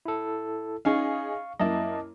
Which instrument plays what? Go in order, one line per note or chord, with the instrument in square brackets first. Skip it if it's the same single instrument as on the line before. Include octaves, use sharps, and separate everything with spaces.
[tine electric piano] E4 A4
[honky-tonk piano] C#4 D#4 G#4 [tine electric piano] F5 C#6
[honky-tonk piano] F#2 A#3 E4 [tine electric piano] D#5 A5